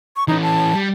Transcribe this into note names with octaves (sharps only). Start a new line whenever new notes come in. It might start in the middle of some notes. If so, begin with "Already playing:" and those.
C#6
E3 C#4 D#4
A5
G3